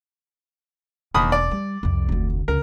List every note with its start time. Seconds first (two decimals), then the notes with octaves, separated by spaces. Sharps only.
1.14 E1 D#2 B5 D#6
1.32 D5
1.52 G3
1.83 C2 F2
2.09 F1 D2
2.48 C#2 A#4